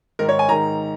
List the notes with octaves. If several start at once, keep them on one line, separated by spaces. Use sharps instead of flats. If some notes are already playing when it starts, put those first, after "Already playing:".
G#2 D#3 A#4
C#5
G#5
G#2 D#3 A#5